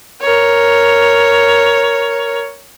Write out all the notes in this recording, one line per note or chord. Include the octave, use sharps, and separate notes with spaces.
A#4 C#5